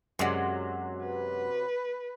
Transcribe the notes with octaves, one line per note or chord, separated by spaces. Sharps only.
F#2 C3 F#3 G#3 D5
B4